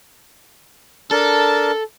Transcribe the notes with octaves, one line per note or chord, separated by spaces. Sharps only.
D4 A4 A#4 A5